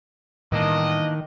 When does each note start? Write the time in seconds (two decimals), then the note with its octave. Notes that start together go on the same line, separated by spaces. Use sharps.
0.52 A2 D#3 E3 G3 A#3 B3 D4 D#5